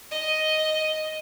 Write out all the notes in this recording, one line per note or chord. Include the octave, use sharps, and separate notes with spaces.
D#5